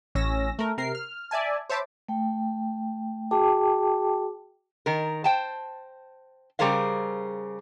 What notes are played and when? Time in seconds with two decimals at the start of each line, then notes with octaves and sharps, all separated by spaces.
0.15 A1 C#4 E6 A#6
0.59 A3 A#4
0.78 C3 A#4 C7
0.95 F6
1.31 D5 E5 G#5 A5
1.70 C5 C#5 E5 A5 B5 D6
2.09 A3 G5
3.31 F#4 G#4 G5 A5 D6
4.86 D#3 A#4
5.24 C5 G5 A5
6.59 C#3 G3 G#4 A#4 C5 F5